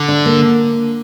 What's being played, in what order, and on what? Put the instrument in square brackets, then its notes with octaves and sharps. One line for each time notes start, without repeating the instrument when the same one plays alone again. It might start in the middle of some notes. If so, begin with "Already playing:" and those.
Already playing: [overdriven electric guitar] D3
[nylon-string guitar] D4
A#3